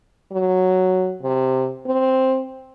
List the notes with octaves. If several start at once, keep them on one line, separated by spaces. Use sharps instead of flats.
F#3
C3
C4